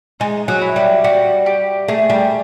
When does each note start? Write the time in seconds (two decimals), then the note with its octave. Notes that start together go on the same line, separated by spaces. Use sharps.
0.20 G#3 D#4
0.48 F#3
0.62 E4
0.76 G3
1.04 G3 F#4
1.46 G4
1.88 A3 G#4
2.10 G3